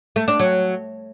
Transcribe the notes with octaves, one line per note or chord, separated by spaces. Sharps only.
A3
D4
F#3